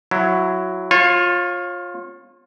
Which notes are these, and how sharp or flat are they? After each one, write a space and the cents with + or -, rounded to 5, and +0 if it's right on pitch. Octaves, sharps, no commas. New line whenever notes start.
F#3 +0 E4 +15
F4 +15 C#5 -30